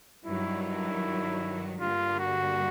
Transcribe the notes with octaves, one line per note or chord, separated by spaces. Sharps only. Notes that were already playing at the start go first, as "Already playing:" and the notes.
G2 D#3 F#3 E4
E4
G2 D3 G3 A#3 F4
F#4